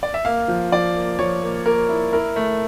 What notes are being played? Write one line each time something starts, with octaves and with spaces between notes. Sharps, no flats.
D5
E5
A#3 F5
F3
F3 D5
A#3
F3 C#5
A#3
A#3 A#4
E4
E4 A#4
A3